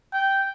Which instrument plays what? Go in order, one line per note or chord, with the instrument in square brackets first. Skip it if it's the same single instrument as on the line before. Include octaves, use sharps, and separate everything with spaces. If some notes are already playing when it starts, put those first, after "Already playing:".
[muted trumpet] G5